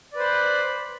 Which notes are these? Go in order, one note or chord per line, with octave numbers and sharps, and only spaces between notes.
B4 C5 D5 B5